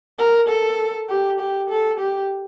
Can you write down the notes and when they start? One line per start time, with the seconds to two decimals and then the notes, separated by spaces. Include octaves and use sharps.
0.19 A#4
0.49 A4
1.09 G4
1.40 G4
1.70 A4
2.00 G4